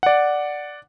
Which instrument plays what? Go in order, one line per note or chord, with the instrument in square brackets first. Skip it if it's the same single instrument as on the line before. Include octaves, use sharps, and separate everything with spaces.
[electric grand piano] D5 F#5